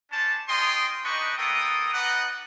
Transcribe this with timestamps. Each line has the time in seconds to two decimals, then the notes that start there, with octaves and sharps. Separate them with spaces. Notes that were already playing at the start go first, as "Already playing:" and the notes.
0.11 C#4 D4 C5 A5
0.48 F4 G#4 C#5 D#5 G5 C6
1.04 D4 D#4 G4 B4 D#5 C#6
1.37 A#3 B3 A4 G5 D#6
1.92 D#4 B4 D5 D#5 F#5